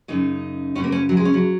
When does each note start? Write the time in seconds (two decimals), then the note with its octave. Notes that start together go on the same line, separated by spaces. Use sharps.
0.08 F#2 C#3 D#4
0.75 F#2 C#3 C#4
0.84 A#3
0.92 C#4
1.09 F#3
1.17 G#3
1.25 C#4
1.34 F#3